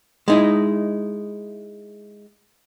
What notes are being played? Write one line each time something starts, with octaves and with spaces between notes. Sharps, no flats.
G#3 D#4 E4